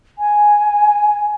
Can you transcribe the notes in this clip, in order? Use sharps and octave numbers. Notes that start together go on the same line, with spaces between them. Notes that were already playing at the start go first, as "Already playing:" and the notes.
G#5